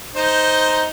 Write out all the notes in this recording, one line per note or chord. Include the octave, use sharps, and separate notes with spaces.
D#4 C5